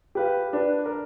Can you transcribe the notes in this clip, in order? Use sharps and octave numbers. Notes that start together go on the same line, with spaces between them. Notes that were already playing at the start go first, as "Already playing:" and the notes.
G4 B4 F5
D4 B4
A#4